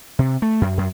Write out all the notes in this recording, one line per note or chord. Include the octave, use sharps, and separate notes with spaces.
C3
A3
F#2
F#2